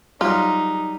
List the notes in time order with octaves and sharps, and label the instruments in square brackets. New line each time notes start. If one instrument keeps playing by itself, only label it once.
[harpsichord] F#3 G3 [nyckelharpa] D#4 [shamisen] F4